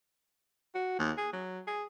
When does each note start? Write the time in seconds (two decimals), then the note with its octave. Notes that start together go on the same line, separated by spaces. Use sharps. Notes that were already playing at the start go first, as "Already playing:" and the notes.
0.75 F#4
0.99 D#2
1.17 G#4
1.33 F#3
1.67 G#4